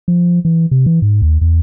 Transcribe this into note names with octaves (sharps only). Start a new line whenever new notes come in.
F3
E3
C3
E3
G#2
D#2
E2